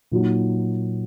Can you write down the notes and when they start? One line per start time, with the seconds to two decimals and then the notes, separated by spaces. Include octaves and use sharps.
0.12 A#2 F#3 A#3 D#4 F#4